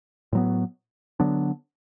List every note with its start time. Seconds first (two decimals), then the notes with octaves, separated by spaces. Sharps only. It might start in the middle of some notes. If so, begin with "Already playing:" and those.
0.33 A2 F#3 B3
1.20 D3 F#3 B3 D4